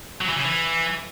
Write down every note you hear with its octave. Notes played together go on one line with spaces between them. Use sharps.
F#3
E3
C#3
E3